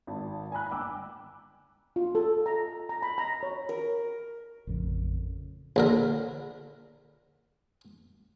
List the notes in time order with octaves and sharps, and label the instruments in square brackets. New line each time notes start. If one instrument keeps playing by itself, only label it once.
[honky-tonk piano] G#1 A5
G#5 A#5 B5 F#6
G1 G5 D6 E6
[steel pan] F4
A4
A#5
A#5
B5
A#5
C#5
[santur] A#4
[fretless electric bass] A1 F2 C#3
[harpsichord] A#1 D3 A#4